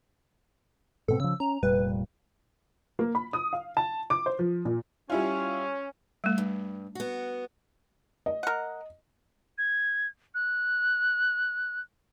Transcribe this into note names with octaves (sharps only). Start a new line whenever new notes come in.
G#2 B2 C4 A4
C#3 F3 E6
C#4 A#5
F1 A#2 G3 B4
A#3
B5
D#6
F5
A5
D6
C5
F3
A#2
G3 C#4 E4 F4
G3 A3
G2
B3 F#4
D#5
A#4 F#5
G#6
F#6